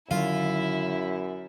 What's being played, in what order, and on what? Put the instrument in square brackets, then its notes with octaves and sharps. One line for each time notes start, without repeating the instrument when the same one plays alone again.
[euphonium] F#2 [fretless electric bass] D3 D#3 F#3 [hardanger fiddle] E4 [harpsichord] F4